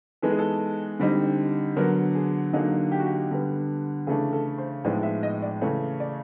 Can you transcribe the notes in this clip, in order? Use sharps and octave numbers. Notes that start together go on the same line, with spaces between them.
E3 G#3 B3 D#4 A4
G#4
A4
D3 G3 C4 D#4
D3 F#3 B3 A#4
G#4
D3 F#3 A#3 D#4 G#4
G4
F#4
G4
D3 G3 B3
C#3 E3 A3 D4 G#4
A4
C5
A2 F3 G#3 B3 D#4 D5
E5
D#5
D5
C#3 E3 A3 C#5
D5